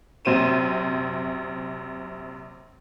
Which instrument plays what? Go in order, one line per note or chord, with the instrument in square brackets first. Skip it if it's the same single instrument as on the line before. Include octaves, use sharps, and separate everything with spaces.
[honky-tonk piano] A#1 F#2 C3 C5 D#7 E7